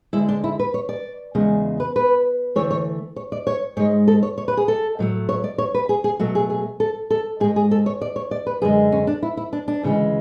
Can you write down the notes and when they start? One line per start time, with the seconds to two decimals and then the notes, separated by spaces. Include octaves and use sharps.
0.13 D2 D3 G#3 E4
0.29 D4
0.44 E4
0.59 B4
0.74 C#5
0.89 D5
1.35 E2 C#3 G#3
1.80 B4
1.96 B4
2.56 D2 C#3 E3 A3 C#5
2.71 C#5
3.16 C#5
3.32 D5
3.47 C#5
3.77 G#2 G#3 C#5
4.07 A4
4.23 C#5
4.38 C#5
4.48 B4
4.57 G#4
4.68 A4
4.99 A2 F#3 A3
5.29 C#5
5.44 D5
5.58 C#5
5.74 B4
5.89 G#4
6.04 G#4
6.19 B2 F#3 A3 F#4
6.35 G#4
6.50 G#4
6.80 A4
7.10 A4
7.40 G#2 G#4
7.44 G#3
7.56 G#4
7.71 A4
7.86 C#5
8.01 D5
8.16 C#5
8.31 D5
8.47 B4
8.62 F#2 D3 G#3 G#4
8.92 C#4
9.07 D4
9.23 E4
9.37 E4
9.53 D4
9.68 D4
9.83 D2 C#3 E3 G#3